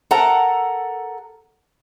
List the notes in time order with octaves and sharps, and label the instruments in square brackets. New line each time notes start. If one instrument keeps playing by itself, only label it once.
[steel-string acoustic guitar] A4 A#4 F#5 A#5